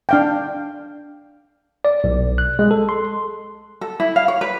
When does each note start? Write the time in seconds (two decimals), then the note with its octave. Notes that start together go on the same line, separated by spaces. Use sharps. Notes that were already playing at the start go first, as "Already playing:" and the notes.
0.09 D4 F5 G5
1.85 D5
2.04 B1
2.38 F#6
2.59 G#3
2.71 A4
2.89 C6
3.81 A4
4.00 E4
4.16 F5
4.28 C#5
4.41 B4